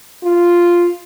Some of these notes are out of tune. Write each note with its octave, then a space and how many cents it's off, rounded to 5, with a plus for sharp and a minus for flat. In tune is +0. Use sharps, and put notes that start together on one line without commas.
F4 -5